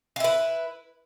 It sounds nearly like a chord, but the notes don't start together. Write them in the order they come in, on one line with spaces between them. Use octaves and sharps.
F4 E4 B4